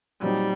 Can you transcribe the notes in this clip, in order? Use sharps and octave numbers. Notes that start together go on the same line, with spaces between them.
A#2 F#3 G3 C4 D#4